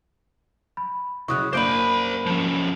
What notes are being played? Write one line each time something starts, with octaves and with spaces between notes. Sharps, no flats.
B5
C#3 F#3 E4 C#6 D#6 F#6
F#2 A#3 D4 C5 B5 D6 G6 D7
F3 C#4